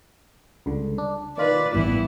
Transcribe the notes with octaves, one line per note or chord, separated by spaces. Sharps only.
C#2 G2 D3
D4
D#3 F4 B4 D5
A1 G2 E3 B3 E4